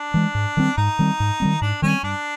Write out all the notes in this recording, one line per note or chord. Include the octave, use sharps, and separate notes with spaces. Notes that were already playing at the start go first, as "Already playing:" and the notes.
Already playing: D4
E3 G#3
G#2
D#3 G3 C4
G#2 D#4
D#3 G3 C4
G#2
D#3 G3 C4
G#2 D4
D#3 G3 C4 C#4
G2 D4